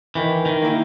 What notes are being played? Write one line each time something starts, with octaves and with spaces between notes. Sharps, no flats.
D#3 E3
D#3
A#3 E4